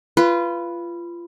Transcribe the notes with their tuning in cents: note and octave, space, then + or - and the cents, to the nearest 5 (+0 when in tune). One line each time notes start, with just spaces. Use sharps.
F4 -25 B4 +0